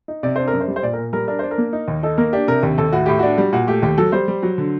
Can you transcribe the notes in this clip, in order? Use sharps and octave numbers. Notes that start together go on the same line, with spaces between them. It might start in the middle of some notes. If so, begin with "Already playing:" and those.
D#4
C3 D5
D4 C5
A#4
F#2
C5
G3
C5
A#2 D5
A#4
A#2
G3 A#4
D4 A#4
D4 C5
A#4
A#3
D#4
D#2
D#4 A4
A#3 A#4
D4 G4
C3 A#4
D#2 G4
D#2 A4
A2 F#4
A2 G4
D4 F#4
G3
A#2 F#4
A3 G4
D#2 G4
F#3 A4
G3 C5
G3
F#3
D3